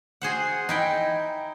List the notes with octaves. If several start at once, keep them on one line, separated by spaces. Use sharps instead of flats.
F#4 G#4 C5 F#5
D#4 E4 G5